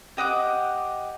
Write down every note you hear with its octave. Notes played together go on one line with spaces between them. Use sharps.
G4 D#5 F#5 D6